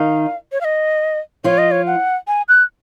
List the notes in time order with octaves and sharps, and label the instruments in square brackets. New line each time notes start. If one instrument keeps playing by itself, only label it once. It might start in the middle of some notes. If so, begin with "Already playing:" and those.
Already playing: [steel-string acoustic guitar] D#3 D#4 [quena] F5
[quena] C#5
F5
D#5
[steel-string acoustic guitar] F3 F4 [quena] C#5
[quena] D#5
C#5
F#5
G#5
F#6